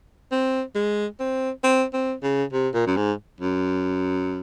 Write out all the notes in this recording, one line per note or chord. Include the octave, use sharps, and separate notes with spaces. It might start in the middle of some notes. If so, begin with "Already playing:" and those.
C4
G#3
C4
C4
C4
C#3
C3
A#2
F#2
G#2
F#2